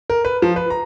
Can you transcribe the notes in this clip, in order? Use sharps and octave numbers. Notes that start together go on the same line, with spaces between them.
A#4
B4
F3
B4
A#5